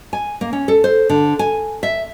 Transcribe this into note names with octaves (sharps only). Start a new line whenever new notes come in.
G#5
A#3
C#4
A4
C5
D3
G#5
E5